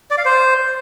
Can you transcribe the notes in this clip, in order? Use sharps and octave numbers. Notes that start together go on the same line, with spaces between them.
D5
F5
C5